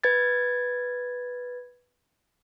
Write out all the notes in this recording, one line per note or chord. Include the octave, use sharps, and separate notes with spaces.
B4 G#6 A6